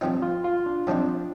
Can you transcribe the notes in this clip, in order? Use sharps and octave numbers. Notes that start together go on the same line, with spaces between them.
G2 F3 C4 D#4 F4
F4
F4
D4
G2 F3 C4 D4 D#4